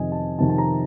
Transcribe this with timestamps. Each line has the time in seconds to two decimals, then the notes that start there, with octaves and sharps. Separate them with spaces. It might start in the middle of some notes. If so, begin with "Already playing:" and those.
Already playing: F2 C3 D#3 D#5 G#5
0.12 A5
0.38 F2 C3 D#3 A5
0.49 A5
0.58 A#5